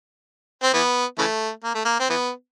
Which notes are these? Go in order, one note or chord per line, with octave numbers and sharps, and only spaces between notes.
C4
E3 B3
C#3 E3 A3
A#3
A3
A#3
C4
E3 B3